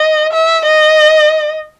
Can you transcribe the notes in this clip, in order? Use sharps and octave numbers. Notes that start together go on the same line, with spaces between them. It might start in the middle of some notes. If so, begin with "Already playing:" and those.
Already playing: D#5
E5
D#5